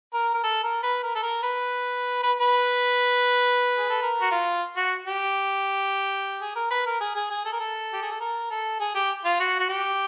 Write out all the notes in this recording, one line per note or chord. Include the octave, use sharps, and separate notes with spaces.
A#4
A#4
A4
A#4
B4
A#4
A4
A#4
B4
B4
B4
G#4
A4
A#4
F#4
F4
F#4
G4
G#4
A#4
B4
A#4
G#4
G#4
G#4
A4
A#4
A4
G4
G#4
A4
A#4
A4
G#4
G4
F4
F#4
F#4
G4